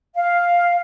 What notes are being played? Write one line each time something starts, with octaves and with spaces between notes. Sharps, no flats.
F5